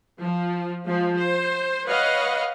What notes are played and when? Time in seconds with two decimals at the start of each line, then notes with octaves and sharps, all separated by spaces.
0.20 F3
0.84 F3 G#3
1.16 C5
1.87 B4 C#5 D#5 F5 F#5